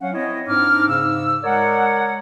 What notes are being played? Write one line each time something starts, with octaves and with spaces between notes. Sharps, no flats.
F#3 C#4 F5 F#5
C4 E4 C#5 D#5
G#2 C4 D4 D#4 D6 F6
G#2 C#3 E6
G#3 A#4 C#5 D5 F#5